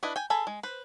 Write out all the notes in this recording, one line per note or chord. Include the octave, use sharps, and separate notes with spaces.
D4 E4 B4 D#5
G5 G#5
G#4 A4 B5
G#3
B4 C5